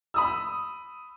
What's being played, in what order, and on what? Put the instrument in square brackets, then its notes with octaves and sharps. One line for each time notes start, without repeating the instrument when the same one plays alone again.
[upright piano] B5 D#6 E6